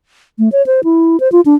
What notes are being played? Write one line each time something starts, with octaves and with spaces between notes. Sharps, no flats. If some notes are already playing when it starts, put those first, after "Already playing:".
A3
C#5
C5
E4
C5
F4
D4